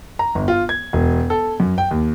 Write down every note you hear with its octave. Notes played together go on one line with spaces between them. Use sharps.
A#5
G1
F4
G#6
E1
A4
F#2
G5
D#2